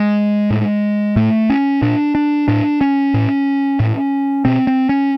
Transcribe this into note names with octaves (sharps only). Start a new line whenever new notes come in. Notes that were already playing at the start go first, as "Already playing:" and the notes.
Already playing: G#3
A2
A2 A3
C#4
A#2 D4
D4
A2 D4
C#4
A2
A2
B2 C4
C4
C#4